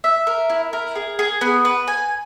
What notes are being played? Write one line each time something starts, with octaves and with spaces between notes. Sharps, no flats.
E5
A#4
E4
A#4
G#4
G#4
B3
B4
G#5